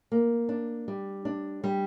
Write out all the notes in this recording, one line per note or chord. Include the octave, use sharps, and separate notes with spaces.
A#3
D4
G3
D4
G3